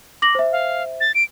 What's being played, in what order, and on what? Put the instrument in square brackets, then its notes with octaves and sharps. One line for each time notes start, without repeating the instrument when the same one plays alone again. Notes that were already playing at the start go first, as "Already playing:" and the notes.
[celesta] D6 A#6 F#7
C5 E5
[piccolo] F5
A6
D7